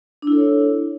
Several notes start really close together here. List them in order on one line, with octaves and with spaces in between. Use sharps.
D4 E4 A4 C#5